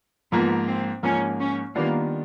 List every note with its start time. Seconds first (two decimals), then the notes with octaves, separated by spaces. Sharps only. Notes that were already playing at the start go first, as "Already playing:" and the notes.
0.32 G#2 F3 A#3 B3
0.67 C4
1.03 G#2 F3 A#3 C#4
1.39 C#4
1.75 D#3 G3 A#3 B3 D4 F4